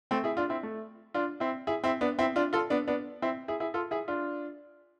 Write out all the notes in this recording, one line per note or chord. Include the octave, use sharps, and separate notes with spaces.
A3 C4
E4 G#4
D4 F4
C4 E4
A3
D4 F4
C4 E4
E4 G#4
C4 E4
B3 D4
C4 E4
D4 F4
F4 A4
B3 D4
B3 D4
C4 E4
E4 G#4
E4 G#4
F4 A4
E4 G#4
D4 F4